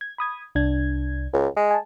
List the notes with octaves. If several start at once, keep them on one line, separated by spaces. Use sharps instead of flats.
G#6
B5 D#6 G#6
C2 D4 G#6
C#2
G#3
G#5 A5